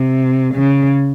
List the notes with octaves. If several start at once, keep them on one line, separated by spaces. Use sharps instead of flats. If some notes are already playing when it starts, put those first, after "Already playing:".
Already playing: C3
C#3